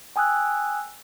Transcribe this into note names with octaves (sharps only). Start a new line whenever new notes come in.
G5 G#5 D#6 E6 F#6